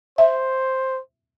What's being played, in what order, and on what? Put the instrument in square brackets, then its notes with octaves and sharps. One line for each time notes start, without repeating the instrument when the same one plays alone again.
[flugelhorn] C5 [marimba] E5